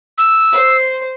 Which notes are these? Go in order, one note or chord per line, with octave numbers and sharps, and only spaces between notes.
E6
C5 C6